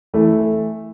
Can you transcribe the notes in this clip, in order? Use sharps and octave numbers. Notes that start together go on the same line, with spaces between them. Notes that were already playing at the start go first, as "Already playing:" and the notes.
E3 A3